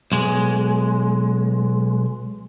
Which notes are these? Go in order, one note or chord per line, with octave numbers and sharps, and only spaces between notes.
B1 G#3